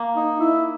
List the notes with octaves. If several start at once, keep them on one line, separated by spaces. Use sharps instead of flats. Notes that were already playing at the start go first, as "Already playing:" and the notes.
Already playing: A#3
D#4
E4